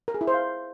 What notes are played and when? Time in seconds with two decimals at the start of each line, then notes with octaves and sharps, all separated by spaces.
0.08 A#4
0.14 G#4
0.21 E4
0.28 C5
0.34 F5